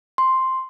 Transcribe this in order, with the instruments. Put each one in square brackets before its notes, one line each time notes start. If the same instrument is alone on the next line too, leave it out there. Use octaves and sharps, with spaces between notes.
[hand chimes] C6